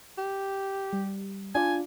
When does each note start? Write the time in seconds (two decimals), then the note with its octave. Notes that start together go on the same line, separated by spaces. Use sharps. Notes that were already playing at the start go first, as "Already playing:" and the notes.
0.18 G4
0.93 G3
1.55 D4 F4 D5 G#5